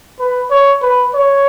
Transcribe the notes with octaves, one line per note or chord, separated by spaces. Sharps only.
B4
C#5
B4
C#5